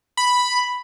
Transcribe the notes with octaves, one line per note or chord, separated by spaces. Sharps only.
B5